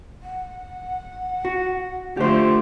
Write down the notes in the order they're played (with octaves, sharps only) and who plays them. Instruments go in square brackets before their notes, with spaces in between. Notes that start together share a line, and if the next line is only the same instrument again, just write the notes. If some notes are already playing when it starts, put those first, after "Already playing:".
[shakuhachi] F#5
[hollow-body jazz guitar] F#4
[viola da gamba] D3 F3 A3 [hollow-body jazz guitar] G4 C5